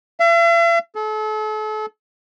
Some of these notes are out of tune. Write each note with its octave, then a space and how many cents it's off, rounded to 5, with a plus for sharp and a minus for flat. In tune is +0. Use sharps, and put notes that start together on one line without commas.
E5 +45
A4 -40